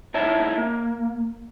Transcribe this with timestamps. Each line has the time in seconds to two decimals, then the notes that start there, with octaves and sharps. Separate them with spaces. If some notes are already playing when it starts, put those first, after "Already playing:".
0.14 D#4 E4 C#5 E5 A5
0.58 A#3